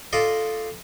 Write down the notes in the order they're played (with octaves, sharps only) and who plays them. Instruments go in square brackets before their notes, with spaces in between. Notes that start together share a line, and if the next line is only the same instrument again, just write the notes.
[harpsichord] F4 A4 D5 D#5